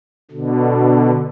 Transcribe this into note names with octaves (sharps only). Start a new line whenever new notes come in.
B2 D3